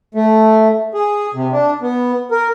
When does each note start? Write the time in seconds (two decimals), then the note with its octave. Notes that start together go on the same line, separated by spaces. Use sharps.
0.15 A3
0.94 G#4
1.34 C3
1.52 D4
1.82 B3
2.31 A#4